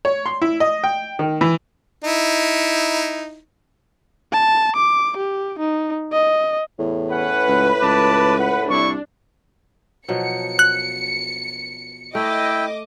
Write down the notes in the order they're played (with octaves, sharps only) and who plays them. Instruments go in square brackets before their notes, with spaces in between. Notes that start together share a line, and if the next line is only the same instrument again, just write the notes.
[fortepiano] C#5
C6
E4
D#5
G5
D#3
E3
[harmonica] D#4 E4
[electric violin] A5
D6
G4
D#4
D#5
[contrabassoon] E2 [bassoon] A2
[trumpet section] C#4 F#5 [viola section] B4
[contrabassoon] C#2
[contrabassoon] C#2 [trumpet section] A5 D6
[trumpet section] F#5
[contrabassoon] C2 [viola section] D4 [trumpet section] E4 C#6
[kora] B2 F3 F#3 [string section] C#7
[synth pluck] F#6
[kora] A3 [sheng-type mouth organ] E4 G5 [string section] D#5 D6